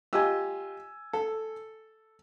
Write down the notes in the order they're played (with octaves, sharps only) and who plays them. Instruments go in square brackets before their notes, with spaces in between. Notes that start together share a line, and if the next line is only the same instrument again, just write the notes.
[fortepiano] F4 G4 D#5 [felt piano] G#5 E6
[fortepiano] A4